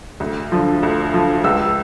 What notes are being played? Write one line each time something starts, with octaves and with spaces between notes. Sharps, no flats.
D2
D3 F3
D2
D3 F3
C#2 E6